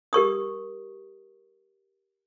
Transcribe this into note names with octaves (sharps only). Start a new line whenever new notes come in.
G4 A#4 C#6 D#6